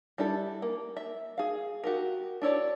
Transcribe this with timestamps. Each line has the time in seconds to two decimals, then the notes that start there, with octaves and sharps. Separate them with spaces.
0.18 G3 D4 E4 A4
0.62 A#3
0.97 E5
1.38 G#4 F5
1.84 F#4 G4 A#4
2.42 D4 E4 C#5 D5